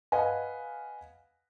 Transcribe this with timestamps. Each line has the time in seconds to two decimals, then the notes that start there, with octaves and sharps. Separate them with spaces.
0.12 B4 D#5 F5 F#5 G#5